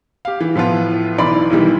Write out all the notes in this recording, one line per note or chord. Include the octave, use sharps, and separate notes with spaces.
G4 F5
E3
A2 F3 B3 F4
B1 E3 D#4 D5 B5 C6
B1 D#3 E3 G3